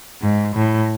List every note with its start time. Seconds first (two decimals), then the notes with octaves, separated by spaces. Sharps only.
0.21 G#2
0.55 A2